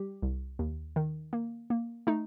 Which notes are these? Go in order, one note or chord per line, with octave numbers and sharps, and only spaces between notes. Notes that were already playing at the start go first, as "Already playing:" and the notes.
Already playing: G3 G4
C2
D#2
D#3
A#3
A#3
A3 D#4